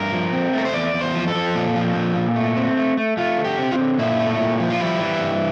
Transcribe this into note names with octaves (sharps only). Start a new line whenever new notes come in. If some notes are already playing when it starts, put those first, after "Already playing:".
Already playing: G2 A#4
F3
C4
A3 A#4
C5
E2 D5
E2
C5
F3
A4
F3
A#2
F3
A#2
A#2
A3
C4
A3
A3
A3 F4
D3
G4
C4
F4
D3
A#2 E4
A3
A#2
F3
F4
G3 E4
E3
G2